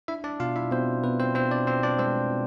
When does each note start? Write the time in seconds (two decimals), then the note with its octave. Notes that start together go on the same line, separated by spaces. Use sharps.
0.08 D4 E4 E5
0.24 D4 D5
0.40 B2 F4 F5
0.56 E4 E5
0.71 B2 C4 C5
1.03 B2 B3 B4
1.20 C4 C5
1.35 B2 C4 C5
1.51 D4 D5
1.67 B2 C4 C5
1.83 D4 D5
1.99 G#3 C4 C5
2.31 B2